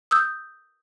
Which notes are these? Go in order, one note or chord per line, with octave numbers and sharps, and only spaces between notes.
D#6 E6 G6